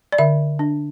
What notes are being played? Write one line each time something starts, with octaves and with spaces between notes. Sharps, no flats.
D5
D3 E5
D4